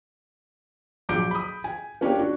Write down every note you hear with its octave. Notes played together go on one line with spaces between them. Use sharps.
A#1 F#3 D6 G6 D7
B5 D#6
G#5
A#3 C#4 D4 G4
D4 F#4